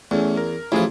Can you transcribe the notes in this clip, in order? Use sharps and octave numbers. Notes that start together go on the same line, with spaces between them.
E2 A3 C#4
A#4
A1 F3 E4 F4 G#4